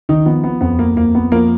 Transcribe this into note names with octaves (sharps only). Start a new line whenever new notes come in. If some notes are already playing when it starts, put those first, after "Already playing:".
D#3 D#4
F3 B3
B3
F2 B3
A#3
F2 A#3
B3
F3 A#3 A#4